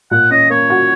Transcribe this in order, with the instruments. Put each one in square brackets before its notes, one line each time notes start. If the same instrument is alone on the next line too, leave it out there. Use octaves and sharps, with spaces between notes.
[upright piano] A#2 [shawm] F#5
[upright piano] C#4 [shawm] D#5
[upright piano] A#3 [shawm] C#5
[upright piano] F#4